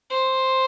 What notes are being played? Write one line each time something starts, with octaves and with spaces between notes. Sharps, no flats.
C5